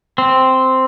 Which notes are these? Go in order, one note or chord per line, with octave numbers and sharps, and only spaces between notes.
C4